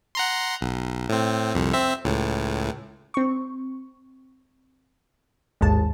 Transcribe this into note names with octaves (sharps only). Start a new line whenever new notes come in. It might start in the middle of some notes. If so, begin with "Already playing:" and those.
F#5 A#5 C6
B1
A2 C4
C2 F2
C4 E5
C#2 A2
C4 C#6
A1 D#2 G#2 G#3 A5